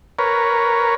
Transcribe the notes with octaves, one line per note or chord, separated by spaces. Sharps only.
A#4 B4 C#5